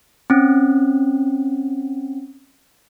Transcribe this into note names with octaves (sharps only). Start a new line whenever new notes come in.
C4 C#4